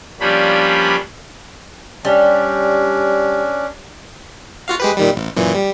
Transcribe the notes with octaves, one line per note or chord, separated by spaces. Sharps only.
F3 G3 A#3 C#4 D4 B5
G3 C#4 D4
F4 F#4 F5
G#3 G4 B4
A#2 D#3 G3
A1
F#2 A#2 E3
G3